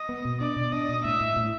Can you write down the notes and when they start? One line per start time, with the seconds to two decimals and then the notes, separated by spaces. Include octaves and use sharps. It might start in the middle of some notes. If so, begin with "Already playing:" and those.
Already playing: D#5
0.09 B3
0.25 B2
0.40 D4 D5
0.56 B2
0.72 D4 D#5
0.89 B2
1.04 A2 E5
1.21 A2
1.37 A2